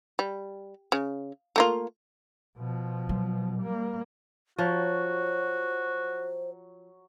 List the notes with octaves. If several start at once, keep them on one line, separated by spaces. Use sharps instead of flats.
G3
C#3
A3 A#3 F4
B2 F3
F#3
G3 A#3
F3 F#3 F#4 C5 C#5